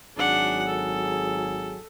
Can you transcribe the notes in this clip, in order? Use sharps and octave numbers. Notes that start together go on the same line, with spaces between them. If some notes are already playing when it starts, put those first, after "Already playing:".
G#1 F#3 D4 G#4 F#5
A4